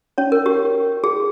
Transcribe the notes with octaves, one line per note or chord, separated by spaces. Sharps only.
C#4 C#5
A#4
G4
G#4